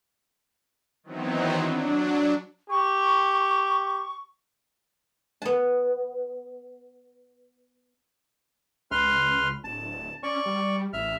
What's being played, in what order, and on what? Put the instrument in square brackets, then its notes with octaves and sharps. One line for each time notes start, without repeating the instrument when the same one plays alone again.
[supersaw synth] D#3 E3 F#3 B3 C4 D#4
F#3 D4
[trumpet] G4 [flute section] C#6
[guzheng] B3 A5
[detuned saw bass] C#2 [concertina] B4 C6 F6
[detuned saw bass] D1 [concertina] A5
[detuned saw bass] C#4 [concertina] D5 C#6
[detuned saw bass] G3
[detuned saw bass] A1 [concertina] E5 F6